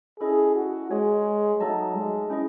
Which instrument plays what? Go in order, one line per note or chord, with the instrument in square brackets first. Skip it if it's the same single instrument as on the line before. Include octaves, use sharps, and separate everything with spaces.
[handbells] C#4 E4 A4 D#5 [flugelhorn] G#4
[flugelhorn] F#4
[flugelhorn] G#3 [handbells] G#4 C#5 G#5
[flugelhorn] F#3 [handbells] A3 D#4 A4 D#5 A5
[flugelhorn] G#3
[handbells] C#4 E4 G#4 D#5